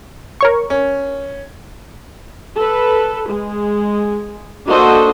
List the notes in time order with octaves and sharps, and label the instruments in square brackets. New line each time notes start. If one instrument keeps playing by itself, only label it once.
[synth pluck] A#4 C#5 C#6
[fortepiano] C#4
[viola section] A4 B4
G#3
A#3 D4 F#4 A4 C5 D#5